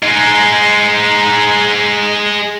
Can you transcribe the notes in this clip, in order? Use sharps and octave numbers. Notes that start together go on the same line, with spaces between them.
G#3 D#4